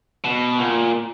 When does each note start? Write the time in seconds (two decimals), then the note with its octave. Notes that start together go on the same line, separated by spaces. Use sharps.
0.24 B2
0.58 A#2